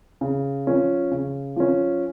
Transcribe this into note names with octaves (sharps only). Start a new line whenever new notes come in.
C#3
F3 C#4
C#3
F3 C#4